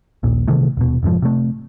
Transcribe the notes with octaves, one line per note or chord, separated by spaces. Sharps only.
A#1 D#2 A#2
C3 D#3 E3 A3
D#1 B2
F1 G#2 B2 F3
C3 A3